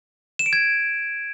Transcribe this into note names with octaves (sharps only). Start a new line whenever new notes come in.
E7
D7
G#6